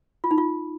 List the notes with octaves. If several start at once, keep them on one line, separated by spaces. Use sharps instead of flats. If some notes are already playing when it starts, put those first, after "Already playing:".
F4
D#4
F4